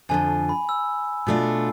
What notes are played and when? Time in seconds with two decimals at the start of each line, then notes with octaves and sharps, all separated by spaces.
0.09 F2 D3 F3 G#5
0.49 B5
0.69 E6
1.27 B2 A3 D4 F4